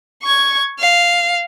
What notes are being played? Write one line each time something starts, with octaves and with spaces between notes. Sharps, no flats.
C#6 G#6
F5